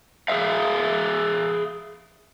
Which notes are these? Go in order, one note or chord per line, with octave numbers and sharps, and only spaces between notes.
G#4 C5 E5 F5